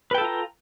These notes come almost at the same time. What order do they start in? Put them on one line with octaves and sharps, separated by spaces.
B4 G5 A4 F4 A#5